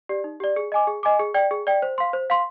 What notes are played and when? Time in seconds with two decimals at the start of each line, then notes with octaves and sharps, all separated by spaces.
0.09 G4 D5
0.24 D#4
0.40 G4 D5
0.56 G#4
0.72 D#5 G#5 D6
0.87 G#4
1.03 D#5 G#5 D6
1.19 G#4
1.34 D5 G5
1.51 G#4
1.67 D5 G5
1.82 C5
1.98 F5 C6
2.13 C5
2.30 F5 C6